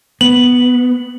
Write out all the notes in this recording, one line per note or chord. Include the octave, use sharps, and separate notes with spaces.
B3 F#7